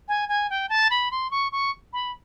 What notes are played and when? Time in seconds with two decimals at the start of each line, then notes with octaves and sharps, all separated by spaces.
0.08 G#5
0.29 G#5
0.50 G5
0.69 A5
0.91 B5
1.11 C6
1.31 C#6
1.52 C#6
1.93 B5